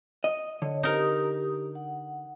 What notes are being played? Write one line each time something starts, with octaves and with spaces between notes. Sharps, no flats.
D#5
D3 C#5 D#5
D#4 G4 A#4 D#6
F#5